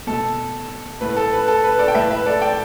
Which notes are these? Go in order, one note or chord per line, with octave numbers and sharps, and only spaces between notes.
B2 A3 A4
A2 A3 B4
A4
B4
A4
B4
A4 D5
G5
A2 A3 B4 E5
B4 E5
A4 D5
D5 G5